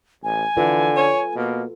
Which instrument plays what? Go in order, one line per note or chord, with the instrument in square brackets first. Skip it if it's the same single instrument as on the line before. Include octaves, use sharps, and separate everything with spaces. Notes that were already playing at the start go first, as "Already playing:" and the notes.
[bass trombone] A1 [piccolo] G#5
[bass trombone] D3 [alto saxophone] E3 [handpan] F4 A4 B4
[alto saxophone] C#5
[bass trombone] B2 [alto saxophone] A#3